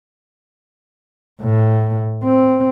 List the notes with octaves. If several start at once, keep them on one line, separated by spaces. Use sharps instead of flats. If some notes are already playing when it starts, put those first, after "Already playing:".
A2
C4